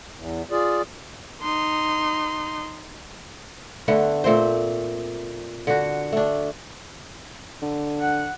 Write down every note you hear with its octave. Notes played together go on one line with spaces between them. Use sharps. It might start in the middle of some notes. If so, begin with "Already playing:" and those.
E2
F4 G#4 D5
D#4 C6
D3 A3 B3
A#2 A3 C4 C5
D3 F#4
A3 D4
D3
F#5